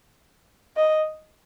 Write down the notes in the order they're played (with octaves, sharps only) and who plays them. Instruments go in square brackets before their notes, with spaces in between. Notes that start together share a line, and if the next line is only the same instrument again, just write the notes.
[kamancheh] D#5